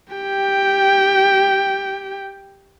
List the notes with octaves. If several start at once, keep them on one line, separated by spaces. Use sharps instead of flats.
G4 G5